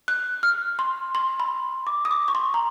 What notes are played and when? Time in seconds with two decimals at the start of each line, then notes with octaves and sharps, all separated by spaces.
0.08 F#6
0.43 F6
0.79 C6
1.15 C6
1.40 B5
1.87 D6
2.05 D#6
2.11 D6
2.28 C#6
2.35 C6
2.54 A#5